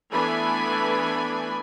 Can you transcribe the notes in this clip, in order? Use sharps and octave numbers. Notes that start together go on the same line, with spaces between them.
E3 A3 B3 D4 G#5 B5